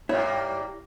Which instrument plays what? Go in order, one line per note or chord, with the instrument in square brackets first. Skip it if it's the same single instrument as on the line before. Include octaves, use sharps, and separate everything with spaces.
[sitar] G2 G3 A#3 [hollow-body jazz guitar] E4 C#5 E5